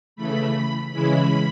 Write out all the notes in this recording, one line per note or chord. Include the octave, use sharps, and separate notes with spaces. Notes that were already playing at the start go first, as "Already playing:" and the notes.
C#3 E3 A3 B5
C#3 E3 G#3 C#4 E4 B5